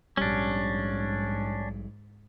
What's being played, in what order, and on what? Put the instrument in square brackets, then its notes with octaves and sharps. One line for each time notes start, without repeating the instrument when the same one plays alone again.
[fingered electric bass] A#1 G3 [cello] G#2 [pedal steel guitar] C#4 D4